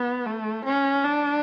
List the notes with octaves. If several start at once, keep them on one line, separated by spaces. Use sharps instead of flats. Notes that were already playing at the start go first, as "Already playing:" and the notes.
Already playing: B3
A3
C#4
D4